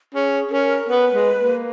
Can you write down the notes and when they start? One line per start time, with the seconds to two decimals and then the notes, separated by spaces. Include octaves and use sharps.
0.14 C#4 G#4
0.51 C#4 A#4
0.88 B3 B4
1.13 G#3
1.39 A#3